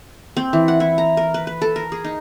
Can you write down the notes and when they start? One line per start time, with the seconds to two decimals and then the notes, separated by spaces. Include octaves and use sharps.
0.37 C4
0.53 E3
0.68 F#5
0.80 E4
0.98 A#5
1.17 A#4
1.34 B4
1.47 B4
1.62 A4
1.76 A#4
1.92 G#4
2.04 D#4